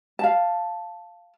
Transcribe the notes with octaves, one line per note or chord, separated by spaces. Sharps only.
F5 A5